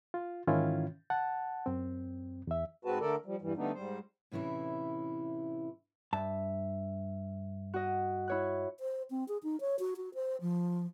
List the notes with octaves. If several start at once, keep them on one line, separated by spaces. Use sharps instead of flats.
F4
G#2 D#3 E3 C#4 E4 F4
F#5 A5
F#2 C4
E2 E5
G#2 G#3 C4 F#4 B4 A5
D3 A3 A4 A#4 D5
F3 G3
E2 G2 E3 G3
D3 G3 A3 B3 D4 D#4
G#2 G3 C5
A2 C3 E3 C#4 E4
G2 E5 A5
F#4 D#5
E4 C#5 F#6
C5
C4
G#4
D#4
C#5
F#4
F#4
C5
F3